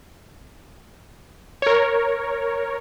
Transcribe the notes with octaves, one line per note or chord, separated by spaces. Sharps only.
A#4 C#5